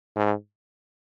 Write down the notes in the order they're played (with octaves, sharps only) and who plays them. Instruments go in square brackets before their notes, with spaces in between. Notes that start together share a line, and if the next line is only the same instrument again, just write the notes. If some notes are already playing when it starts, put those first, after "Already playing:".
[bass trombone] G#2